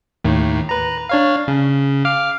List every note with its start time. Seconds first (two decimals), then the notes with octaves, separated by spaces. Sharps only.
0.24 D#2 A2 D#3
0.69 B4 A#5
1.09 D4 C#5 F5
1.48 C#3
2.05 F5 D6 F6